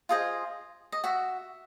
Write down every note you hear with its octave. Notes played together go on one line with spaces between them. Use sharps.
F4 G#4 C5 D#5
D#5
F#4 E5